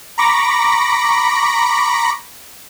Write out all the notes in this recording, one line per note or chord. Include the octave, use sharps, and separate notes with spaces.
A#5 B5 C#6 D6 A#6